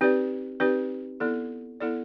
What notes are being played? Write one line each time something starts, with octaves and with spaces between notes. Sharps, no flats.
C4 D#4 G4 B4 D5
C4 D#4 G4 B4 D5
B3 E4 A4 D5
B3 E4 A4 D5